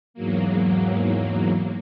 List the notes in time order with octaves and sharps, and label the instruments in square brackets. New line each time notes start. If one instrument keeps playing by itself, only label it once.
[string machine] E2 G#2 F#3 A#3